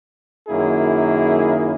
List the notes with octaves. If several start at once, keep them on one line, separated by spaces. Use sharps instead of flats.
F#2 D#3 A#3 E4 G#4